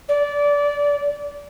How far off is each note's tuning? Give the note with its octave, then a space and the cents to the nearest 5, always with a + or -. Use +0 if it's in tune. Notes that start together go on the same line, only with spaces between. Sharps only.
D5 -20